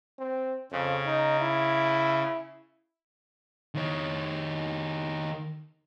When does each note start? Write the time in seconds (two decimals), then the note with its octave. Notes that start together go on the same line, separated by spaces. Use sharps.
0.18 C4
0.71 F2 C#3
1.06 D#4
1.40 E4
3.75 D#3 C#5